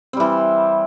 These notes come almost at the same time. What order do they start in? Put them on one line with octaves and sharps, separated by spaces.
C4 G3 E3